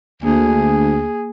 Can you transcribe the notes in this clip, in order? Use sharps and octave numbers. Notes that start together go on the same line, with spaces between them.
D2 A#3 G#4